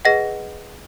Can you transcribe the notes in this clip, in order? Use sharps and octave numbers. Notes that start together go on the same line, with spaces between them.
G#4 B4 D#5 F#5 A#6